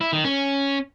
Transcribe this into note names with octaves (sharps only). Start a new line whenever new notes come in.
E4
D#3
C#4